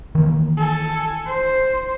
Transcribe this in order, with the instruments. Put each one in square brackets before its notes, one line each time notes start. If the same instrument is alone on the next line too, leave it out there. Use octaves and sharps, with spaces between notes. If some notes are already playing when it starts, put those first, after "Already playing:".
[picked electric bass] D#3 E3 A#3
[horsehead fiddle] A4 G#5
C5